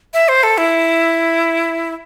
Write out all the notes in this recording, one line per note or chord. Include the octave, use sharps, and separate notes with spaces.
E5
C5
A4
E4